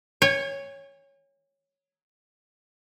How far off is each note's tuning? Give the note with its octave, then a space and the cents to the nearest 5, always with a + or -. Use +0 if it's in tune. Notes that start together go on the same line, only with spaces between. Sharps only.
C#5 +0 G#5 -45